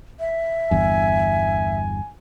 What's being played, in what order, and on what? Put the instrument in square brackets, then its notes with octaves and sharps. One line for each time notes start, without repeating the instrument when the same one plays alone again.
[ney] E5
[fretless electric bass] G1 E2 G2 [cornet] G#5